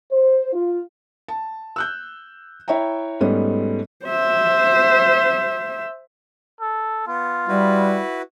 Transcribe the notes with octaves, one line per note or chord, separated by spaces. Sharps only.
C5
F4
A5
E6 F#6 G6
E4 C#5 E5 G5 A#5
G#2 G3 A3 B3 C#4
C5 E5
A4
B3 F4
G3 E4 F#4 B4